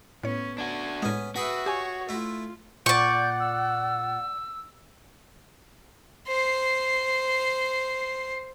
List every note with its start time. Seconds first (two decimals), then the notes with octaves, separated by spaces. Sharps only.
0.24 A2 B3 C#4 C#5
0.58 D4 F#4 G#5
1.02 A2 G#3 B3 C#4
1.36 F#4 G#4 B4 E5 G5 B5
1.66 G4 C#5 G#5
2.09 A3 E4 F4
2.86 A#2 D5 F#5 C#6 G6 A6
3.40 E6
6.28 C5 C7